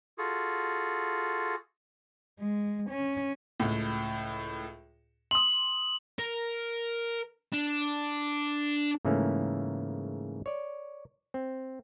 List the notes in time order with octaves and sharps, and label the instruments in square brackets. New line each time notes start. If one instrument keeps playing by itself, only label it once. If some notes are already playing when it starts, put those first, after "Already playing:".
[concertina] F4 F#4 G#4 A4
[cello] G#3
C#4
[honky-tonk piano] C#2 A2
[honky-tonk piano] C6 D#6 [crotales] F#7
[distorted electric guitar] A#4
D4
[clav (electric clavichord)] G#2 C#3 E3 A3 A#3 C#4
C#5 D5
C4